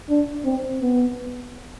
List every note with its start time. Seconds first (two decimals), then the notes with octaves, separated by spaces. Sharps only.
0.09 D4
0.45 C4
0.82 B3